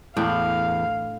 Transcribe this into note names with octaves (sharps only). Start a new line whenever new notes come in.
E2 A2 D4 F5 G5